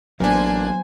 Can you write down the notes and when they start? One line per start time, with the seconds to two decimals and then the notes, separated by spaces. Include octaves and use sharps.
0.20 A1 F#3 A#3 B3 D4 C5 G#5